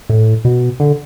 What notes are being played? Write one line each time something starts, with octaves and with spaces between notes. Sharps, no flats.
A2
B2
D3